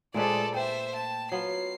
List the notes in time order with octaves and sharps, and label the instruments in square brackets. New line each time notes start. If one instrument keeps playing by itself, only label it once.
[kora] A#2 A3 B4 [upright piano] G#3 G#4 C5 [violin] A4 D5
[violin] C5 E5 [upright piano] G5
[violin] A5
[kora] F#3 B3 F4 [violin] C7